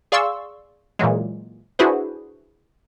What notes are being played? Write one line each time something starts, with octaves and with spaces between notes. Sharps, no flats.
G#4 D5 F5 C6 C#6 E6
A#2 E3 F#3 G#3
D4 E4 F#4 G#4 B4 C5